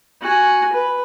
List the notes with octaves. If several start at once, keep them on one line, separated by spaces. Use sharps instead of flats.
F#4 G#5
B4